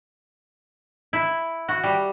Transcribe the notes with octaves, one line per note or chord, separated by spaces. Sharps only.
E4
F#4
G3